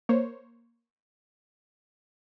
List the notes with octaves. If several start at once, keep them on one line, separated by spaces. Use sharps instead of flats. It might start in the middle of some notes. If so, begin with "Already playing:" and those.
A#3 C5 C#5